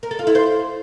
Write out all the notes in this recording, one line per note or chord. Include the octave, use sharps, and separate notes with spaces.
A#4
A4
F4
E4
C5